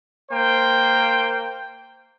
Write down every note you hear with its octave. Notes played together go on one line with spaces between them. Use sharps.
A#3 C5 G5